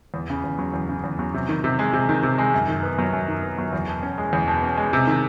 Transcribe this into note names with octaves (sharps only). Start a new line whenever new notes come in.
E2
C#3
E2
F#3
E2
C#3
E2
F#3
C3
D#3
C3
G#3
C3
D#3
C3
G#3
F#2
D#3
B3
F#3
F#2
D#3
B3
F#3
E2
B2
C#4
G#3
E2
B2
C#4
G#3
C3
D#3